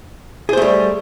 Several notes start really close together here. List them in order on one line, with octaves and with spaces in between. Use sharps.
G#4 C5 A3 G3